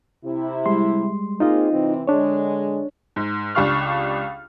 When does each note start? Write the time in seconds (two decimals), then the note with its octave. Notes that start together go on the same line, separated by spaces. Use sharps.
0.25 C3 E4
0.66 G3 G#3 C6
1.40 A#3 C4 D#4 F4 G#4 D#5
1.72 C3 E3 C4
2.07 D3 G#3 D4 C#5
3.16 G#2
3.55 C#2 D4 G4 F5 C#6 F6